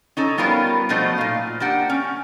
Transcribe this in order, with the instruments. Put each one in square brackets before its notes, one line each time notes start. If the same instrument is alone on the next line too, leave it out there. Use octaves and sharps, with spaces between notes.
[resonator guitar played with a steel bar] C#4 D#4 A4
G3 B3 F4 A#4 B4 C#5
B2 F3 F#3 A3 D#4 C5
A#2 F5
A#3 D4 G4 F#5
C#4